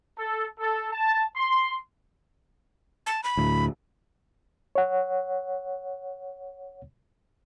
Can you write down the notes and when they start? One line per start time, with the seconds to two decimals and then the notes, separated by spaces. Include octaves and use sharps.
0.17 A4
0.59 A4
0.91 A5
1.36 C6
3.06 A5
3.23 B5
3.37 D2 A2
4.75 C#5 F#5